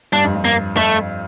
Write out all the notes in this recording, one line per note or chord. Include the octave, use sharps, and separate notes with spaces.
G2 D4
F2
G2
A#3
F2 A3